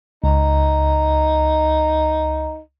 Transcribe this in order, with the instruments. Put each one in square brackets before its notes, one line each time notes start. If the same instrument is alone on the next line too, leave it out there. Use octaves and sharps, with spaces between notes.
[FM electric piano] C#2 [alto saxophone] D#4